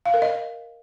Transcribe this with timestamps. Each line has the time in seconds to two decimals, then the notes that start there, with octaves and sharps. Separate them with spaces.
0.06 F5
0.14 A#4
0.22 D#5